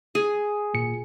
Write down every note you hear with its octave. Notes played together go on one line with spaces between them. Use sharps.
G#4
G#1 A#2 C#7